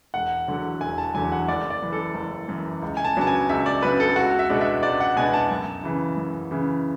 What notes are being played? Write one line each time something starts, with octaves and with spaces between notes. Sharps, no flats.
E1 F#5
E2 D3 F#3
E1 G#5
A5
E2 D3 F#3 G#5
F#5
F#1 D5
D5
F#2 E3
A4
F#1
F#2 E3
C#2
G#5
A5
C#3 F#3 B3 D4 A5
G#5
C#2 E5
D5
C#3 F#3 B3 D4 B4
A4
C#2 F#4
E5
B2 G#3 B3 D4
E5
C#2 D5
F#5
B2 G#3 B3 D4 G#5
A5
F#2
C#3 E3
F#2
C#3 E3